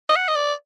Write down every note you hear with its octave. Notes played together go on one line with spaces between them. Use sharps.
D#5
F#5
D#5
D5